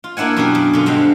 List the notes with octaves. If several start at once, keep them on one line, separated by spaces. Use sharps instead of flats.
F4
A#3 D4 E4 F#5 G#5
F#2 B2 D4 F4 G4 G#4
F#2
B2 D3 F4
G2 D3 G#3 C4